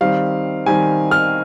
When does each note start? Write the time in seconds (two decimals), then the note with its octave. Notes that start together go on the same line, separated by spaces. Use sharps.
0.01 D#3 G3 C4 F5
0.66 D#3 G3 C4 G#5
1.11 F6